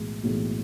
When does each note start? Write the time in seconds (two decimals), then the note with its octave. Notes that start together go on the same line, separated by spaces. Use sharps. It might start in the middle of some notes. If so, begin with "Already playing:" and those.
Already playing: B1 A2 E3 G#3
0.23 B1 A2 E3 G#3